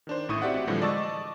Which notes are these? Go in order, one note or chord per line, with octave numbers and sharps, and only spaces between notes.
D#3 D4 C5
A1 A2 E4 C#6 D#6 D#7
C4 F#4 G4 D5 E5 F#5
A2 D3 E3 F3 G3 G#3
D5 D#5 A5 C#6 E6 A6